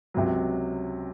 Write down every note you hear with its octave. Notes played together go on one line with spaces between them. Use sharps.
C#2 C3 F#3